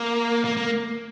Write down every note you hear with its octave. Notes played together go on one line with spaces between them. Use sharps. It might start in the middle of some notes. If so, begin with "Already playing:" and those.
Already playing: A#3
A#3
A#3